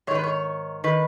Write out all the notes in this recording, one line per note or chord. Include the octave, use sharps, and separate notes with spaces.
G#2 D#3 B4 C#5
C#5
D#3 B4